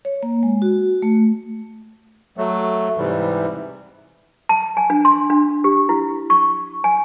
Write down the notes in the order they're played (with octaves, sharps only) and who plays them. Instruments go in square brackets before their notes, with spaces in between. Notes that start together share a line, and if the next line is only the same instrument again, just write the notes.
[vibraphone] C#5
A#3
G#3
F#4
A3
[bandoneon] F#3 A3
G#2 C3 E3 G3
[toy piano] A5
G#5
D4
C6
D4
G4
E4
C#6
G#5